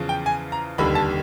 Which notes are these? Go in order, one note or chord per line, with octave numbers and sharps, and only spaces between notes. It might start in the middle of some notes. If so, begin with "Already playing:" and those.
Already playing: E2 C#3 F3
G5
G#5
A#5
F1 D#2 D3 G3 B5
A5